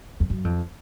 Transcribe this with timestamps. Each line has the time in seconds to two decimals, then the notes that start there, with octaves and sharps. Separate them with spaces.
0.20 F2
0.30 F#2
0.44 F2